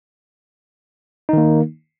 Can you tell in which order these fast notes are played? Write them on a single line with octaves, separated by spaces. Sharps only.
D#4 D#3 A#3